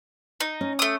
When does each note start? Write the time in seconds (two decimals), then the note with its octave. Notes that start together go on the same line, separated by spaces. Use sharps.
0.40 D#4
0.61 C#4
0.79 A3 D#6